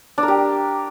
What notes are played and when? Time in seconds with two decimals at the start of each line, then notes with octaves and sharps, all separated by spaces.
0.18 D4
0.23 A#4
0.28 G4